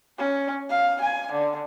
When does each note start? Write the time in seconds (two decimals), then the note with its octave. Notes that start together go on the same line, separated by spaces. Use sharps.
0.18 C#4
0.70 F5
1.01 G#5
1.32 D3